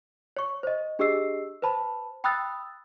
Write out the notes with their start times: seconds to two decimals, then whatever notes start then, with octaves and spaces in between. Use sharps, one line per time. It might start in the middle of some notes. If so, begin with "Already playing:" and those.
0.37 C#5 C#6
0.63 C5 D#5
0.99 D4 G4 G#4 D#5 E6 C7
1.62 B4 C5 A5 B5
2.24 G5 B5 D#6 E6 F#6 A6